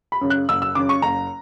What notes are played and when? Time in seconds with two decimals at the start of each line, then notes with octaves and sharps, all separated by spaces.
0.12 B5
0.21 F#2 C#3
0.30 F#6
0.49 F#1 E6
0.62 E6
0.75 F#2 C#3 D6
0.89 C#6
1.02 F#1 A#5